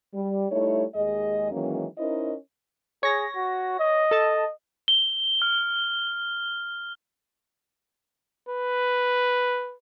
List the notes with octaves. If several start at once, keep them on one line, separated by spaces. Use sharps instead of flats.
G3
G3 A3 D#4 E4 C#5
D#2 G#3 G#4 D#5
D#3 E3 F#3 G#3 A#3 C#4
C#4 D#4 E4 A#4 C5 D#5
G#4 C#5 A#6
F#4
D#5
A4 A5
G7
F6
B4